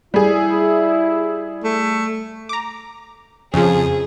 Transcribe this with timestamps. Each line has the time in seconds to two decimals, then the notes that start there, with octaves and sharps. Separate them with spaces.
0.14 G3 E4 G#4
1.64 A3
2.49 A#5 D6
3.54 F2 C#3 F3 G#4